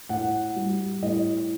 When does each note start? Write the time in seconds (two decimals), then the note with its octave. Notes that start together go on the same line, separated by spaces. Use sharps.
0.09 A2 F#5
0.56 G3
1.02 A2 D#5